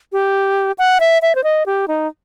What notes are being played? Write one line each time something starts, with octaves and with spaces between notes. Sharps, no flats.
G4
F#5
E5
E5
C5
D#5
G4
D#4